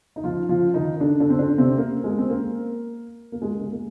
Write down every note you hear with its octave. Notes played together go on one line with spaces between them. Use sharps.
D#4
F3 F4
F3 F4
D#3 D#4
D3 D4
D3 D4
C4
D3 D4
C3 C4
A#3
G#3
C4
A#3
A#3
G#3
G#3
A#3